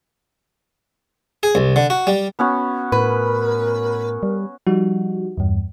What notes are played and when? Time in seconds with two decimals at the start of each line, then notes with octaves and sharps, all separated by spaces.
1.43 G#4
1.55 C2
1.76 D3
1.90 F#4
2.07 G3
2.39 B3 C#4 F#4
2.92 A2 A#4 B4
4.23 G3
4.67 F3 G3 D#4 F#4
5.37 E2 G2